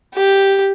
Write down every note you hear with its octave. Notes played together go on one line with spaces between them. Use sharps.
G4